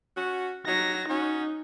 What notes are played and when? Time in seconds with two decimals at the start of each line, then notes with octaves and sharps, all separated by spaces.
0.17 C#4 F#4
0.67 F#3 D#4 A#6
1.08 C#4 D#4 F#4